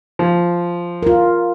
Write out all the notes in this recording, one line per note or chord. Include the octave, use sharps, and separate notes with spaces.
F3
F4 A#4